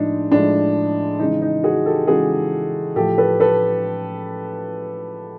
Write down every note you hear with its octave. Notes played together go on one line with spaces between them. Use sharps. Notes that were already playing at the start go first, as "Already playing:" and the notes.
Already playing: A2 F3 G#3 D4 D#4
A2 F3 G#3 D4
C#3 E3 G#3 D#4
D#4
F#4 G#4
G4 A4
C#3 E3 G#3 F#4 G#4
A2 F3 A3 G4 A4
A4 B4
A4 B4